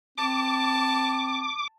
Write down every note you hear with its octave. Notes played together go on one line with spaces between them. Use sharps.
C4 A5 D6